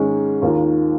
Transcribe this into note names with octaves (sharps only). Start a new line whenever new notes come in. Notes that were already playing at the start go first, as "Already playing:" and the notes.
Already playing: G#2 D#3 G#3 C#4
D#2 D#3 A#3 F4